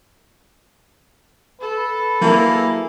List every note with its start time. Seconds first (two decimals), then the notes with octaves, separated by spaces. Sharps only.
1.62 A4 B4
2.21 F#3 A#3 E4 G#4